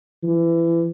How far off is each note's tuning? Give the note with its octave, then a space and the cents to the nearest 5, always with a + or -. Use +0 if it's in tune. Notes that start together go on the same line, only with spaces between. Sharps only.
E3 +25